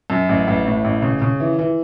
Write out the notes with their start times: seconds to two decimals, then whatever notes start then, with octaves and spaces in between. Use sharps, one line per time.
0.10 F#2
0.29 A1
0.47 A1
0.66 A2
0.84 A1
1.02 C#3
1.22 C#3
1.40 E3
1.59 E3